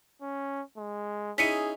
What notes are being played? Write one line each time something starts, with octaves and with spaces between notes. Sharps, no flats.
C#4
G#3
C#4 D#4 E4 G#4 B6 C#7 D#7